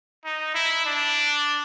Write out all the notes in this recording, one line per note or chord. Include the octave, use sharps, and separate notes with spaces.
D#4
E4
D4